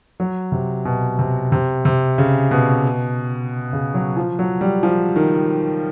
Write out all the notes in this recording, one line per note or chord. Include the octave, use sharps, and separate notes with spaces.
F#3
C3
B2
C3
C3
C3
C#3
B2
C#3
F#3
F3
F#3
G3
F3
D#3